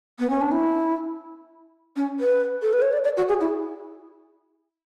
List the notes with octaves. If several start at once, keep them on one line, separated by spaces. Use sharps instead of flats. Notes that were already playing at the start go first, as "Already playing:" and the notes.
B3
C#4
D4
E4
C#4
B4
A4
B4
C#5
D5
D5
F#4
G#4
E4